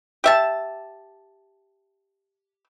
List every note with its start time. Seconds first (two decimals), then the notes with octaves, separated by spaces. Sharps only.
0.24 G4 E5 A5